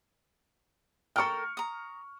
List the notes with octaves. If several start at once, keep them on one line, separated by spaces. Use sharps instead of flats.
A4 A#4 G5 C#6 F6
A#5 D#6